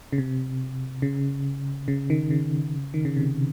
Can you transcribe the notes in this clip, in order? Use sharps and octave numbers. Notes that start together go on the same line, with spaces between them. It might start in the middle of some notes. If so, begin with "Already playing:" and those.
C#3
C3
C#3
C#3
D#3
C#3
D#3
C#3
C3